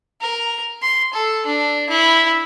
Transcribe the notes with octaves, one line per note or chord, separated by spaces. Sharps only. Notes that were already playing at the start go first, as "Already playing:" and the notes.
A#4
C6
A4
D4
E4